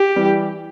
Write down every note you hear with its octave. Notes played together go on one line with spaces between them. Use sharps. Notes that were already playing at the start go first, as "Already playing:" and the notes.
Already playing: G4
E3 G3